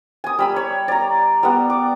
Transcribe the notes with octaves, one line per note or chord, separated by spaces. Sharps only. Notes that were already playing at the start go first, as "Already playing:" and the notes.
G#5 D#6
G3 B5 E6
C#5
D5 A#5
G3 B3 F#5
D6